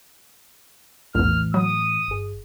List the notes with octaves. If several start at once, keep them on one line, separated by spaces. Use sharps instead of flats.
A#1 E2 A2 E3 F6
F#3 D#6
G1 G#4